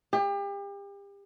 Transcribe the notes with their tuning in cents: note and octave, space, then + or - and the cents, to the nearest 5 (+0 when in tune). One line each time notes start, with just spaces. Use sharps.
G4 +35